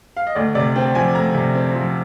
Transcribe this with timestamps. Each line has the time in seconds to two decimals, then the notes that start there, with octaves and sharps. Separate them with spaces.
0.17 F5
0.27 D#5
0.35 D2 D5
0.55 C3 D5
0.76 C4 G5
0.95 F3 G#5
1.15 D2 A#5
1.35 C3
1.55 C4
1.75 F3